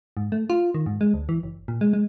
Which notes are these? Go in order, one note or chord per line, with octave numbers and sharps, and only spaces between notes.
G#2
A3
F4
D#3
G#2
G#3
D2
E3
F#1
A#2
G#3
G#3